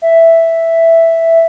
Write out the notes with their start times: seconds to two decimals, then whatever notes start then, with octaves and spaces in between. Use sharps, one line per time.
0.02 E5